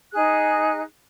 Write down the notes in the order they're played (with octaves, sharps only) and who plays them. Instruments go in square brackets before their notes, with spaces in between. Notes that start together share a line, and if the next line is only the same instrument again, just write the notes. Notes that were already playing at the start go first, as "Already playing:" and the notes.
[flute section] D#4 G#4 F#6